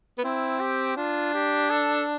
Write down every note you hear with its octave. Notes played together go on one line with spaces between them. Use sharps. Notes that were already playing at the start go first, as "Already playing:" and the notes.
B3
C4 E4
G4
D4 F4
G4
A4